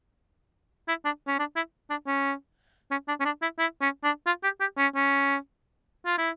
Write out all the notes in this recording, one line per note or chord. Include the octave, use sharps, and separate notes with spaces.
E4
D4
C#4
D4
E4
D4
C#4
C#4
D4
C#4
D4
E4
E4
C#4
D4
F4
G4
G4
C#4
C#4
F4
E4